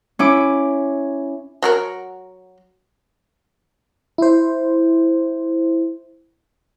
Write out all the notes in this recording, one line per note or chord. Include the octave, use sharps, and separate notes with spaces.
C#4 E4 D6
F#3 F#4 A#4
E4 C5